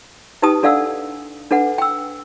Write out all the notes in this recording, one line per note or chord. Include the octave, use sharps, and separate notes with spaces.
D#4 G4 B4 G5 A5 D#6
D4 A4 D5 F5 F#5 E6
D4 A4 B4 F#5
G5 E6